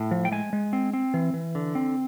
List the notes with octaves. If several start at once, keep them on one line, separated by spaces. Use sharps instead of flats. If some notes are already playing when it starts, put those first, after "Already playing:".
Already playing: A2
F3
G5
G#3 G#5
G#3
C4
C4
E3
E3
D3
C4